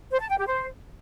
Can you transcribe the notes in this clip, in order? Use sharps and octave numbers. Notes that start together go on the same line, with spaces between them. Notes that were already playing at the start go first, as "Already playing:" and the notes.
C5
A5
G5
G4
C5